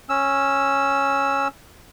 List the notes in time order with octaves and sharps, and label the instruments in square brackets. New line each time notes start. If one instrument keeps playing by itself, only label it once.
[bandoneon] C#4 E6